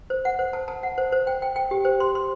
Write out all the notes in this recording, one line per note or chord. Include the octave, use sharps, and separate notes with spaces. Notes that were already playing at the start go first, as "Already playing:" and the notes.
C5
F#5
C5
A5
A5
F#5
C5
C5
G5
G5
G5
G4
C5
C6
C6